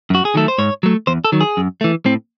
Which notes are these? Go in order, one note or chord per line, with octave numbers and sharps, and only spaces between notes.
F#2 F#4
G#4
D#3 F#3 A3 A4
C5
G#2 C#5
F#3 A3
E2 C5
A4
D#3 F#3
G#4
F#2
E3 A3
A2 C4